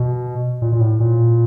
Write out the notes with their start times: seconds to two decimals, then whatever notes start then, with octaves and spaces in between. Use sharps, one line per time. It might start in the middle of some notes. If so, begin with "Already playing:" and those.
Already playing: B2
0.62 A#2
0.72 A#2
0.80 A2
1.00 A#2